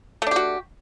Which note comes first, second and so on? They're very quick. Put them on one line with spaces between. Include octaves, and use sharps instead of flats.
A3 D4 G4 F#4